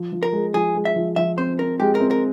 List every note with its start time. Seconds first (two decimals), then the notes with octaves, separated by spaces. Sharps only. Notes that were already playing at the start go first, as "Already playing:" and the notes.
Already playing: F3
0.12 F3
0.23 A#4
0.32 G#3
0.54 F3 G#4
0.75 G#3
0.85 E5
0.96 F3
1.16 F3 E5
1.37 C4 C5
1.58 C4 A#4
1.80 G#3 G4
1.95 A#4
2.00 C4
2.11 A#4